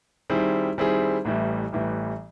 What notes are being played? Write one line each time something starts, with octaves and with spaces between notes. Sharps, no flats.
D#3 G3 C4 E4 G#4
D#3 G3 C4 E4 G#4
A1 A2 E3 G3
A1 A2 E3 G3